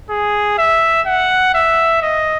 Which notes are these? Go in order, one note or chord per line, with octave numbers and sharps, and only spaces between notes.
G#4
E5
F#5
E5
D#5